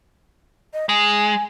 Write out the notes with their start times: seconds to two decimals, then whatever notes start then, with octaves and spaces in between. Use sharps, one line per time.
0.73 D#5
0.89 G#3 G#5